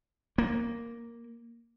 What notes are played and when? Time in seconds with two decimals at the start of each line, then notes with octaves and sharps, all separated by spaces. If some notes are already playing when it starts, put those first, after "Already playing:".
0.38 A#3